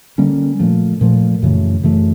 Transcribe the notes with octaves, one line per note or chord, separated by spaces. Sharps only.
D3 G3 A#3 C#4
A#2 F3 A3
A#2 F3 A3
F#2 C#3 E3 A3
F#2 C#3 E3 A3